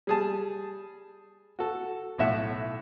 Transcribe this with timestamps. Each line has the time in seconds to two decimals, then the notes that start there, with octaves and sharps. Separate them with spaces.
0.07 G3 G#4 A5
1.59 F#4 A4
2.18 B1 A2 E5 F#5